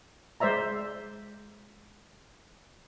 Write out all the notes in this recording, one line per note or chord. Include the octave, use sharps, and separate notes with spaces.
G#3 C5 D5 E5 A#5